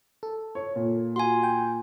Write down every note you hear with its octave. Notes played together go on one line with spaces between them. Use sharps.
A4
C#5
A#2
F4 F#4 G#5 C6
G5